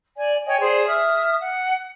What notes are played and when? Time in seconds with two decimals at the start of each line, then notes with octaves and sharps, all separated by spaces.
0.18 D5 G#5
0.46 C#5 D#5 G5 G#5
0.60 G#4 C5 D5
0.87 E5 D#6 F6
1.39 F#5